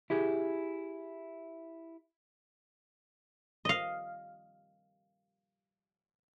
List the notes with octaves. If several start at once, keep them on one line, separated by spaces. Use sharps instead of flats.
E4 G4 G#4
D#5 F5